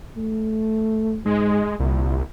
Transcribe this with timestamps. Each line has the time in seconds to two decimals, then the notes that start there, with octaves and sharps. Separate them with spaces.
0.17 A3
1.26 G#2 G#3
1.80 C2 A#2